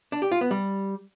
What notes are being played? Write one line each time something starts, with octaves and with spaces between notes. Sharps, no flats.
D4
G4
F4
B3
G3